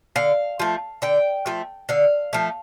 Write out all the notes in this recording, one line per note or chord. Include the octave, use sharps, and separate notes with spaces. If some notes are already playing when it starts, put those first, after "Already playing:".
D3 F5
F3 A3
D3 G5
F3 A3
D3 F5
F3 A3